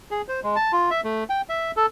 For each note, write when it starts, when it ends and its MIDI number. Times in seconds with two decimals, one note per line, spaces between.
0.11 0.22 68
0.28 0.40 72
0.43 0.56 56
0.56 0.72 81
0.72 0.90 65
0.91 1.01 76
1.04 1.24 57
1.30 1.41 79
1.49 1.71 76
1.76 1.86 69